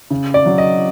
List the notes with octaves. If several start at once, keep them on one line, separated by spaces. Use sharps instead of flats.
C#3
D5
F#3
D#5